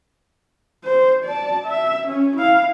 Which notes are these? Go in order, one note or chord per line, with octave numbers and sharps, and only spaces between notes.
C5
D5 A5
E5
C#4
E4 F5